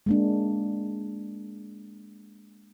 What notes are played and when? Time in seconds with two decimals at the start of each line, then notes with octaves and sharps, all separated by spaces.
0.06 G#3 A#3 D4